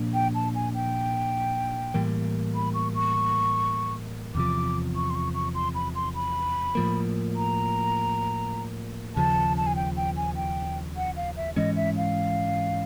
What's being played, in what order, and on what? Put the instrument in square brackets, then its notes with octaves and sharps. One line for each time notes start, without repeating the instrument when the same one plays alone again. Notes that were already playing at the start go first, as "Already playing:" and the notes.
Already playing: [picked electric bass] A#2 F3 A#3 D4
[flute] G5
A5
G#5
G5
[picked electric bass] A2 E3 G3 A#3
[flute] B5
C#6
C#6
[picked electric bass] E2 C3 F3 [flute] D6
[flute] C#6
C6
C#6
C#6
C6
B5
C6
B5
[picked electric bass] A2 F3 A#3
[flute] A#5
[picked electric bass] D#2 C#3 F3 [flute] A5
[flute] A5
G#5
G5
G5
G#5
G5
F#5
F5
E5
[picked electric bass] G#2 E3 G#3 C#4 [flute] D#5
[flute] E5
F5